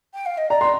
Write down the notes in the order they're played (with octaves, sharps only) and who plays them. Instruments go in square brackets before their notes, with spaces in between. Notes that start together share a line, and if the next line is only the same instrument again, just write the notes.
[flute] G5
F5
D#5
[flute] D5 [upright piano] A#5
[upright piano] C6